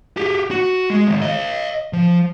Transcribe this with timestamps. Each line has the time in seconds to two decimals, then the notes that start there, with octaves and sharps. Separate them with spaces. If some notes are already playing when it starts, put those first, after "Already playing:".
0.17 G4 G#4
0.51 F#4
0.90 G#3
1.08 D#3 G#3
1.22 C#5 D#5
1.93 F3